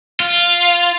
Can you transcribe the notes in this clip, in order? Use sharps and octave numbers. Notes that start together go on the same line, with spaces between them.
F4